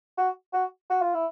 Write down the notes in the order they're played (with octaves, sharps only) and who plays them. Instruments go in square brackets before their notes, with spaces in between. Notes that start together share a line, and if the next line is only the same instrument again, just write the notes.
[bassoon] F#4
F#4
F#4
F4
E4